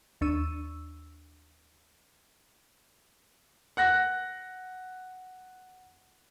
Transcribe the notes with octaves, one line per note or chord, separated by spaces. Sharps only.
D#2 D4 C#6 E6 D#7
F#5 F#6 A#6